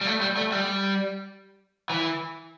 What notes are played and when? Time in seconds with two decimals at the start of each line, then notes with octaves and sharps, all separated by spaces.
0.01 G3
0.06 A3
0.21 G3
0.37 A3
0.52 G3
1.90 E3